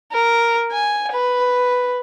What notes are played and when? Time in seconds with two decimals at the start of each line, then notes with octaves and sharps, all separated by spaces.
0.12 A#4
0.72 G#5
1.12 B4